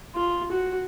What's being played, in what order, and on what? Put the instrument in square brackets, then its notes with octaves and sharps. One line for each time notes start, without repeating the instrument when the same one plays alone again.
[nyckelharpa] F4
F#4